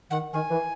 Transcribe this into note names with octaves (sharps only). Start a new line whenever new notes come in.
D#3 F#5
D#3 G#5
E3